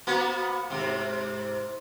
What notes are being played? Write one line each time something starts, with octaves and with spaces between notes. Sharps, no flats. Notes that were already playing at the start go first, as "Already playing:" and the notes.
A#3 B3 F#4
G#2 C3